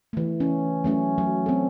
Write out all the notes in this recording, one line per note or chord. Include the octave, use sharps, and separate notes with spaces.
E3 A3
C#4
F#3 A3 C#4
F#3
C4 A4